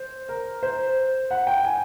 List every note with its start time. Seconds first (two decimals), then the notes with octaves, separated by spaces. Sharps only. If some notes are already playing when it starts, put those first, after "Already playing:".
Already playing: C5
0.29 A#4
0.63 C5
1.31 F#5
1.47 G5
1.65 G#5